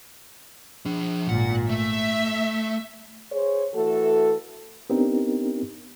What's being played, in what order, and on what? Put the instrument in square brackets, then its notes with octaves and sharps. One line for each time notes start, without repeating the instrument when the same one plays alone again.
[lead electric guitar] F3 D4
[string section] G#1 A#2 [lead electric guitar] F#5
[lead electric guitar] A3 [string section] E5
[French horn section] G#4 C5 C#5
E3 A3 F#4 A4
[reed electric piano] B3 C4 D4 D#4 G4 A#4